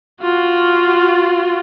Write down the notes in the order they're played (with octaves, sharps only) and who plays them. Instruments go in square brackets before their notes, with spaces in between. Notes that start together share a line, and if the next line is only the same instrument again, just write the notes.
[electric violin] F4 F#4